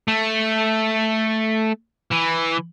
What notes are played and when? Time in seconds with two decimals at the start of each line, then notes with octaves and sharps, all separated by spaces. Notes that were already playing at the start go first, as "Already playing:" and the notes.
0.08 A3
2.12 E3